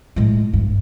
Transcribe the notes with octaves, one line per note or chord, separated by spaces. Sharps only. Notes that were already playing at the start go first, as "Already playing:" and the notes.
A2 G#3
G2